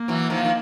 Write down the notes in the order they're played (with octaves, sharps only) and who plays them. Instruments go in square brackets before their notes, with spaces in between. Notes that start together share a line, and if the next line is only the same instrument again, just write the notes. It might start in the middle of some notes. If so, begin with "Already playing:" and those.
Already playing: [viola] A#3
[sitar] E3 F#3
D#3 F3
D#3